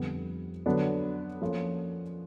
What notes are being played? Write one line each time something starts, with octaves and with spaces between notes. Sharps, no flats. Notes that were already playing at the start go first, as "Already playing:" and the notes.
Already playing: F2 D3 G3 B3
D3 F#3 B3 D4
F3 A#3 C#4 F4 A4